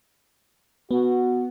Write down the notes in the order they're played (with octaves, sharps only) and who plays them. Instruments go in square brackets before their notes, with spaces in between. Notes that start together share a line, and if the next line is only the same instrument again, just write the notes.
[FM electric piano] B3 [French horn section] F#4